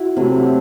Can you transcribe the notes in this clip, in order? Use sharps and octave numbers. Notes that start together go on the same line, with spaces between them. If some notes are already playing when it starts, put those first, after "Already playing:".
Already playing: E4 F#4
C3 F#3 A3 C4